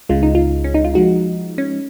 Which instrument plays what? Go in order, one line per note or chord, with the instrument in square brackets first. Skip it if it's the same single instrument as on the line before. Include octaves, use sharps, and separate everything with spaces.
[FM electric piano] C#2 C#3 G#3 [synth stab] F4
[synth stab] D#4
F4
C#4
D#4
F4
[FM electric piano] F3 G#3 D#4 [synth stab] F#4
[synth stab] C#4